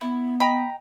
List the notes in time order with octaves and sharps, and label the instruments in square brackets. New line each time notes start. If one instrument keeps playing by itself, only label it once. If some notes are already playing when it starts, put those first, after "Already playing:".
[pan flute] B3 [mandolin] E4
[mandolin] D#5 G5 A#5 [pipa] B5